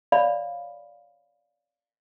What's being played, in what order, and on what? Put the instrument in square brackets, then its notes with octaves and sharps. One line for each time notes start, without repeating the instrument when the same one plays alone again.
[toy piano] C#5 D5 F5 B5